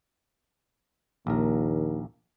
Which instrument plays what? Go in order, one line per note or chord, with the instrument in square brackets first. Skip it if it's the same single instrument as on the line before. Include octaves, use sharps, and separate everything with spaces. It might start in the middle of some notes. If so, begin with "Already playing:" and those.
[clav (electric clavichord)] A#1 A#4 [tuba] D#2